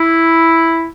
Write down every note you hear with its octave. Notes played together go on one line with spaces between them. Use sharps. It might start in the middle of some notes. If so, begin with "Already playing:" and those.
Already playing: E4